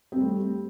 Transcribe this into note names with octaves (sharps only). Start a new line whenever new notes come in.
G3 A3 C4